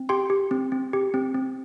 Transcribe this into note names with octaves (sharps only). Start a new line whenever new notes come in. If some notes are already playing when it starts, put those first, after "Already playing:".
Already playing: C4
G4 G5 C6
G4
C4
C4
G4
C4
C4